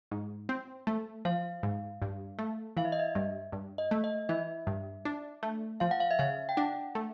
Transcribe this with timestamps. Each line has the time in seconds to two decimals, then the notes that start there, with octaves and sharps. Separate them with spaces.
0.11 G#2
0.49 C4
0.87 A3
1.25 F3 F5
1.63 G#2
2.02 G2
2.39 A3
2.77 E3 F5
2.85 E5
2.92 D#5
2.99 E5
3.15 G2
3.52 G2
3.78 D#5
3.91 A3
4.04 D#5
4.29 E3 E5
4.67 G2
5.05 D4
5.43 A3
5.80 F3 F5
5.91 F#5
6.00 F5
6.11 E5
6.19 C#3 F5
6.49 G5
6.57 D4 F#5
6.95 A3